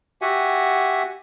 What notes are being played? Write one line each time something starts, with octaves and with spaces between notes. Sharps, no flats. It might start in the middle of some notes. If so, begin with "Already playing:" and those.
F#4 G4 E5 F#5 G#5